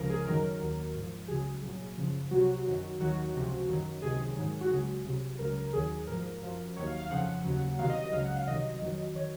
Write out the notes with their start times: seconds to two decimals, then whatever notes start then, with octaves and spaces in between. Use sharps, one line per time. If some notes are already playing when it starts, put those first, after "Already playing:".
Already playing: C#2 C#3 F3 A#4
0.10 G#4
0.26 F#2 D#3 F#3 A#4
0.60 D#2 D#3 F#3
0.95 G#2 F3
1.28 C#2 C#3 F#3 G#4
1.63 C2 A#2 F#3
1.97 F#2 C#3 F3
2.31 C2 C3 F#3 F#4
2.65 F#2 D#3 F#3
2.99 D#2 D#3 F#3 F#4
3.34 C#2 C3 F3
3.68 F#2 D#3 F#3
4.02 C#2 C3 D#3 F#3 G#4
4.36 G#2 D#3 F#3
4.61 F#4
4.71 C#2 C#3 F#3 G#4
5.05 C2 C3 F#3
5.39 C#2 C#3 F#3 A#4
5.56 A#4
5.73 D#2 D#3 F#3 G#4
6.07 G#2 F3 A#4
6.41 F#2 F3
6.76 D#2 D#3 F#3 C#5
6.87 F5
6.99 F5
7.10 F2 C#3 F3 F#5
7.44 D#2 C#3 F#3
7.79 C2 C3 D#3 F#3 F5
7.89 D#5
8.02 D#5
8.12 C#2 C#3 F#3 F5
8.24 F#5
8.36 F5
8.47 C2 C3 D#3 F#3 D#5
8.81 F2 D#3 F#3
9.15 D#3 F#3 C#5